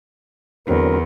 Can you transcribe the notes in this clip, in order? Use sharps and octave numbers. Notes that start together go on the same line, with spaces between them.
E2 D3 F#3 C4 A#4